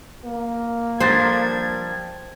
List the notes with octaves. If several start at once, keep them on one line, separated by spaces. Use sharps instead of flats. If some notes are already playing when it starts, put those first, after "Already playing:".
A#3
F3 G3 D4 C5 G#6